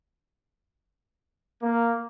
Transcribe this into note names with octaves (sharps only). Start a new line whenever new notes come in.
A#3